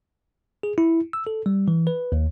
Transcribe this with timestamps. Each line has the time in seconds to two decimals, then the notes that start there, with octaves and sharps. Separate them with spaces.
0.63 G#4
0.78 E4
1.13 E6
1.27 A4
1.46 G3
1.68 E3
1.87 B4
2.12 D#2